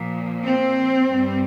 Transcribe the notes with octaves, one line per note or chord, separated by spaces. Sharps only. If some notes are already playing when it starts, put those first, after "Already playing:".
Already playing: A#2 F3
C4
G2 G3